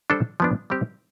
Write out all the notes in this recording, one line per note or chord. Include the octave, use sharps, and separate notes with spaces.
G3 D4 A4 C5
F3 B3 D4
G3 C4 G4 C5